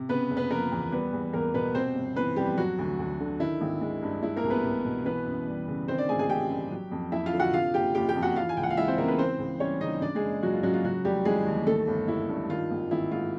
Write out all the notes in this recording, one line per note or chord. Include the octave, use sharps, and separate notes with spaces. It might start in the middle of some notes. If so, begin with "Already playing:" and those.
Already playing: C3
C#3 B3 B4
F#1
B3 B4
F3 A#3 A#4
E2
G3 B3 B4
E2
E2 A#3 A#4
B2 B3 B4
C3 C4 C5
G1
E3 B3 B4
F2 G3 G4
F#3 F#4
D2
D2
D3
D#3 E4
G#1
G#3
G2
G#3 E4
A#3 A#4
C2
B3 B4
C2
B2
E3 B3 B4
F#2
G3
C#3
D#3 C4 C5
D4 D5
A1 G#4 G#5
G#4 G#5
A1 G4 G5
G2
F#3
F2
F2 E4 E5
F4 F5
D3
F#4 F#5
C3 F4 F5
F#1 G4 G5
F#1 G4 G5
G4 G5
F2
F#4 F#5
E3 F4 F5
G#5
C#2 G5
F#5
F5
G#3 E4 E5
C4 C5
C#3 A#3 A#4
B3 B4
E3 C4 C5
C#2
G3 C#4 C#5
C#3 D#4 D#5
C#3 D4 D5
G#3 G#4
F#1
F#1 F#3 F#4
F4
F#2 F#3 F#4
F4
C#3 F#3 F#4
F1 G3 G4
E3 G#3 G#4
D#2
D#3 A3 A4
G1
G1 E4
G2
D#3 F4
G#1
G#1 E4
G#2 F4